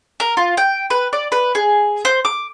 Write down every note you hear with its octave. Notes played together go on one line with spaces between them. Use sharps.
A#4
F4
G5
B4
D5
B4
G#4
C5
D6